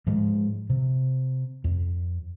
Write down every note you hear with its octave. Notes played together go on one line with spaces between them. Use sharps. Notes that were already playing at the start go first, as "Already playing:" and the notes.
G#2 F3 G#3
C3
F2